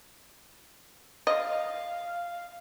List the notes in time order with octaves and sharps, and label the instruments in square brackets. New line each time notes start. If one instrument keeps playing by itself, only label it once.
[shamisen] D#5 [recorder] F5